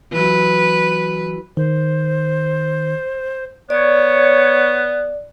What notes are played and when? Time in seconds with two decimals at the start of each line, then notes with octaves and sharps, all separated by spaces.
0.13 E3 F#3 B4
1.57 D#3 C5
3.70 B3 C#5 D5